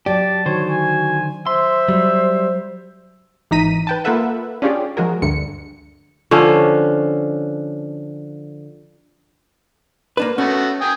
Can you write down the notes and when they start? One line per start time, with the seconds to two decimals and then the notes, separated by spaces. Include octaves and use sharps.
0.06 F#3 G4 D5 A5
0.46 D3 D#3 F#4 C5 C#5
0.69 G#5
1.47 C5 E5 C6
1.89 F#3 G3
3.51 G#1 E3 D#4 A#5 B6 D#7
3.87 B4 G5 A5
4.04 A#3 F4 A4 B4 E5 F#5
4.62 C#4 D4 F4 G4 G#4 D5
4.97 F3 G#3 F#4 G#4 A#4
5.22 D2 G2 D3 C#7
6.31 D3 F3 C#4
10.17 A#3 D4 B4
10.38 A3 B3 C#4 F#4
10.81 G5 G#5 D#6